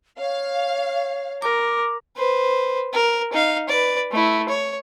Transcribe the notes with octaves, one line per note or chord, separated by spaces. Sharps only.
C#5 F5
A#4 D6
B4 C5
A#4
D#4 F5
B4 D5
A3 E4
C#5